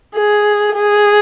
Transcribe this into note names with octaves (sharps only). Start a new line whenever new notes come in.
G#4
G#4